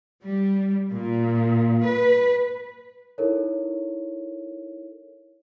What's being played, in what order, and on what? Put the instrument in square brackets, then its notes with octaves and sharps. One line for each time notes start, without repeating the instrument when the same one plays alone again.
[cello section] G3
A#2
B4
[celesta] D#4 E4 A4 A#4 C#5